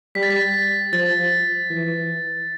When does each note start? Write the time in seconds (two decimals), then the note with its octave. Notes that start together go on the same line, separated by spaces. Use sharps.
0.15 G3 B6
0.23 A6
0.30 B6
0.93 F3 A6
1.70 E3